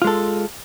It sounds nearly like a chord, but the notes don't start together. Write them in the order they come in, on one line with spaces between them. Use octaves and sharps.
F4 G#3 A4